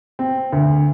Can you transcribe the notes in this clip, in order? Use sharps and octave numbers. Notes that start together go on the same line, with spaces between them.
C4
D2